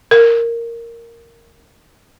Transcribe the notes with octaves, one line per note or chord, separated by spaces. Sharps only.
A#4